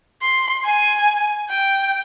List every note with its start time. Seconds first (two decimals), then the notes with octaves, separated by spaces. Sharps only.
0.21 C6
0.64 G#5
1.49 G5